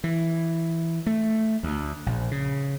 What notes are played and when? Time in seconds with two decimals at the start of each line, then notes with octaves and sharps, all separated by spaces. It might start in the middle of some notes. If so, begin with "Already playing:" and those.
0.04 E3
1.06 A3
1.63 D2
2.06 A#1
2.31 C#3